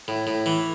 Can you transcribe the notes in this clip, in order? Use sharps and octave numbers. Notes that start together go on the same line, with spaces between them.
A2
A2
E3